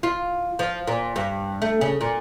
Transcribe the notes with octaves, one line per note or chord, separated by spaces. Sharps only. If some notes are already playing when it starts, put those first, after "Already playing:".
F4
F3
A#2
G2
A3
C#3
A#2